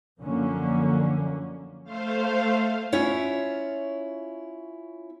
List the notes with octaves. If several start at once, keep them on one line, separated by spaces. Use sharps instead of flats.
F#2 D3 F3 A#3 C#4
A3 C5 F5
C#4 E4 F4 C#5 F#5